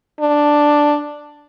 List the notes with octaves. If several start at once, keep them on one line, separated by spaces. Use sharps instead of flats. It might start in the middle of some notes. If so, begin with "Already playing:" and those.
D4